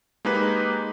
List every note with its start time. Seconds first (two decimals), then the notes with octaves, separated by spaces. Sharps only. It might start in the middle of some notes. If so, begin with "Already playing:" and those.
0.25 G#3 A#3 D#4 G4 B4